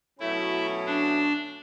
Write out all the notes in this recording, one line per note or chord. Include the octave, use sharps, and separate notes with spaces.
B2 F#3 A3 C#4 E4
D4